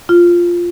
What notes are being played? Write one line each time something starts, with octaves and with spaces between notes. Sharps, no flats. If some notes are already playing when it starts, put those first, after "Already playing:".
F4